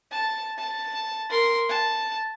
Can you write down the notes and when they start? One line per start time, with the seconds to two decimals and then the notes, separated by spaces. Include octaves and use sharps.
0.11 A5
0.58 A5
1.30 A#4 C6
1.69 A5